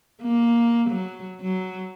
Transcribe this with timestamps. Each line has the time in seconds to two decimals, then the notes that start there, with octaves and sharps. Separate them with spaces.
0.23 A#3
0.90 F#3
1.41 F#3